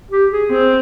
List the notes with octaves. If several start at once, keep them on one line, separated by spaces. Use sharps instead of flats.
G4
G#4
C4 G#4